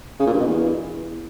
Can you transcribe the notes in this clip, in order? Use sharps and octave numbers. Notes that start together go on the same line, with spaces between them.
C#3
A#2
G2
B2
E2